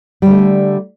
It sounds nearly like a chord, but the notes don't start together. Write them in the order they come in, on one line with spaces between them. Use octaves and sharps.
G3 D3 A3